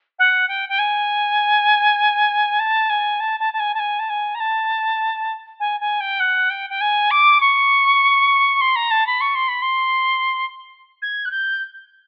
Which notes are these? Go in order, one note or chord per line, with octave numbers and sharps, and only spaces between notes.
F#5
G5
G5
G#5
A5
G#5
A5
A5
A5
G#5
A5
G#5
A5
G#5
A#5
A5
G#5
G#5
G5
F#5
G5
G5
G#5
D6
C#6
C6
A#5
A5
B5
C#6
C6
B5
C6
G#6
F#6
G6